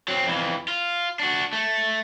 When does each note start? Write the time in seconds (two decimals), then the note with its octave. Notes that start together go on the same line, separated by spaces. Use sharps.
0.08 F#3 C4
0.27 F2 E3
0.68 F4
1.20 D4 F#4
1.53 A3